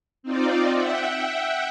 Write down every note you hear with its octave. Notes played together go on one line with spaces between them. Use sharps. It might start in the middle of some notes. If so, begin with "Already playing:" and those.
C4 D#4 F4 D5
E5 F#5 G5